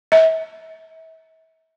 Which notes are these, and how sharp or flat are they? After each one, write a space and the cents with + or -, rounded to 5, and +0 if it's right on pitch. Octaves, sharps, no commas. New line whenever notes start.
E5 -40